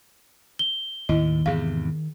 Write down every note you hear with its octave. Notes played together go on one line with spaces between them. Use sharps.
G7
D#2 A2 D#3 E4 D#5
E2 G#2 C3 G#4 F5